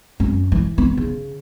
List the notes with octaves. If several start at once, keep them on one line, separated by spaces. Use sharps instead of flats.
F#2
E3
B3
C#3